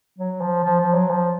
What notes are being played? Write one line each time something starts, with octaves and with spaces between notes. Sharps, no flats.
F#3
F3
F3
F3
F#3
F3